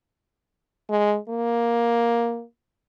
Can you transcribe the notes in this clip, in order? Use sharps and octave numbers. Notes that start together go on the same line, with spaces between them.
G#3
A#3